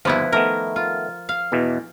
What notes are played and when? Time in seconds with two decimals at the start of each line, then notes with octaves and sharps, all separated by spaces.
0.05 G1 D#2 F3 B3 E4 B4
0.32 D#3 A3 B3 A#4
0.76 F4
1.29 F5
1.52 E2 B2 E3